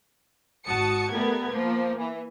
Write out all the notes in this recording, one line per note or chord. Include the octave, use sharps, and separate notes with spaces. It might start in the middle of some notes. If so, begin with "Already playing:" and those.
G#1 F#4 A5 D#6 C#7
G3 A3 B3 A#4 G#6
F3 A#3
E3